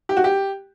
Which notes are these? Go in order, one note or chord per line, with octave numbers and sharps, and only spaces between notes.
G4
F#4
G4